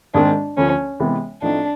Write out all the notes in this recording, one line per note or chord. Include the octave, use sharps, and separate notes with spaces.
G#2 D#3 G#3 C4 D4
D2 D3 F3 C#4
C3 E3 G#3 B3
A2 F3 A3 C4 D4 D#4